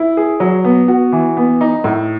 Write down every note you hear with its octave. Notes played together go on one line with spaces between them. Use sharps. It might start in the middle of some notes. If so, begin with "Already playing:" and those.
Already playing: E4
G#4
F#3
B3
F#4
E3
B3
D#4
A2